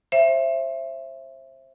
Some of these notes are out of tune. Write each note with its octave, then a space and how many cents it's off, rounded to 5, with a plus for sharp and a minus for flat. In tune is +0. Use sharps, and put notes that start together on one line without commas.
C5 +25 E5 +15